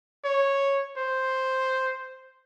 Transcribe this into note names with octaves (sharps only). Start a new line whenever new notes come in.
C#5
C5